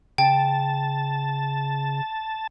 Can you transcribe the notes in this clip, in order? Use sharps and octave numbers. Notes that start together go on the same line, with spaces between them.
C#3 G5 A5